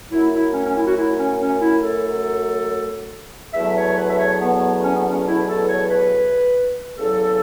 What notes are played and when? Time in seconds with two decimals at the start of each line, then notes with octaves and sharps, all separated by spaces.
0.11 F#2 F#3 A3 E4
0.33 E4
0.54 C#4
0.66 C#4
0.75 E4
0.87 F#4
0.97 E4
1.19 C#4
1.40 C#4
1.61 E4
1.83 A4
3.54 E2 B2 F#3 A3 E5
3.76 C#5
3.97 B4
4.10 E5
4.19 C#5
4.41 B3
4.84 C#4
4.96 B3
5.10 C#4
5.26 E4
5.48 A4
5.69 C#5
5.90 B4
6.97 E2 C#3 F#3 A4